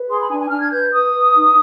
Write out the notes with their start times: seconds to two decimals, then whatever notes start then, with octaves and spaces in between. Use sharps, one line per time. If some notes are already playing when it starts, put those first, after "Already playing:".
Already playing: B4
0.09 G#4 C6
0.19 B5
0.30 D4 G#5
0.40 G#5
0.50 D4 F6
0.61 G#6
0.71 B4 G6
0.92 B4 D#6
1.13 B4
1.34 D#4